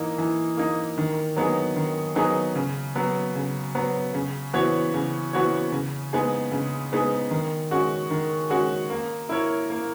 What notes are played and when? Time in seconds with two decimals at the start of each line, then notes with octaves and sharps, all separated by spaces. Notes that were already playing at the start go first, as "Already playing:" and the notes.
Already playing: E3 A#3 D#4
0.18 E3
0.57 A#3 D#4
0.98 D#3
1.36 F#3 B3 D#4 G#4
1.76 D#3
2.16 F#3 B3 D#4 G#4
2.55 C#3
2.96 F#3 B3
3.36 C#3
3.75 F#3 B3
4.14 C#3
4.53 E3 B3 F#4 C#5
4.94 C#3
5.33 E3 B3 F#4 C#5
5.72 C#3
6.13 G#3 B3 D#4 G#4
6.52 C#3
6.92 G#3 B3 D#4 G#4
7.31 D#3
7.71 G#3 C#4 F#4
8.11 D#3
8.50 G#3 C#4 F#4
8.90 A#3
9.29 E4 A#4 C#5
9.70 A#3